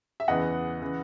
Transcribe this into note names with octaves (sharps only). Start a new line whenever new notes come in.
E5
E2 C#3 E3 D#5 F#5
C#3 E3